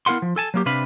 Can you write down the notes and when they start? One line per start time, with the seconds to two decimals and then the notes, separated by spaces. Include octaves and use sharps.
0.06 B3 E4 A#4 F5 F#5 C6
0.22 F3
0.36 A4 G#5 A5
0.54 F#3 A#3 G4
0.66 C3 D4 B4 F5 B5